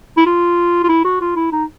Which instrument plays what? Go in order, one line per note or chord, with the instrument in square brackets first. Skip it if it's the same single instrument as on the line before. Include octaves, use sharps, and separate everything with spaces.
[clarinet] E4
F4
F4
E4
F#4
F4
E4
D#4